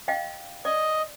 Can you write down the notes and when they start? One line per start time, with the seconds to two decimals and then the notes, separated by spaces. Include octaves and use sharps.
0.08 D#5 F5 G5
0.65 D5 D#5